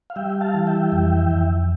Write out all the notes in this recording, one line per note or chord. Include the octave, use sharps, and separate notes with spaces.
F5
G3 E5 G5
F5 A5
E3
E5 G5
F2
F2